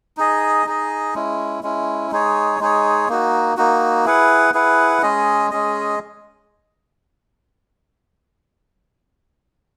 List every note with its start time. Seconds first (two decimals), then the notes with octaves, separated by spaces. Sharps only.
0.17 D#4 G#4 D#5
0.66 D#4 G#4 D#5
1.14 G#3 C#4 E4
1.63 G#3 C#4 E4
2.12 G#3 D#4 G#4 C#5
2.60 G#3 D#4 G#4 C#5
3.09 A#3 D#4 F#4
3.57 A#3 D#4 F#4
4.05 E4 G#4 B4 F#5
4.54 E4 G#4 B4 F#5
5.02 G#3 C#4 G#4 D#5
5.51 G#3 C#4 G#4 D#5